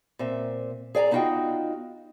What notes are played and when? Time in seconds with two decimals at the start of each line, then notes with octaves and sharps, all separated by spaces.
0.19 A#2 C4 E5
0.95 G#4 D5 G#5 A#5
1.11 B3 D#4 F4 F#4 D#5 G5